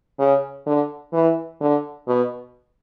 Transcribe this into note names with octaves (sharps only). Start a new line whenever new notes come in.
C#3
D3
E3
D3
B2